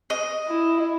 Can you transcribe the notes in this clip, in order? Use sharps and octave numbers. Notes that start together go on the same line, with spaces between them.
D#5
E4